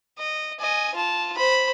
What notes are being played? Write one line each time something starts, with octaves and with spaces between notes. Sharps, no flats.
D#5
D#5 G#5
F4 A5
C5 B5